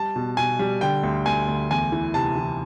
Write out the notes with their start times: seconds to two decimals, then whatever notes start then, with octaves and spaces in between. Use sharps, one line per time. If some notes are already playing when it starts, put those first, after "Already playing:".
Already playing: G3 A5
0.16 B2
0.37 B2 G#5
0.59 G3
0.81 D3 G5
1.03 D2
1.26 D2 G#5
1.48 D2
1.70 E2 G#5
1.92 E3
2.14 C3 A5
2.36 E3